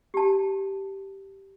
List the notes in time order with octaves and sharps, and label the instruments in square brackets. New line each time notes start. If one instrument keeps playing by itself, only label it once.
[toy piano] G4 A5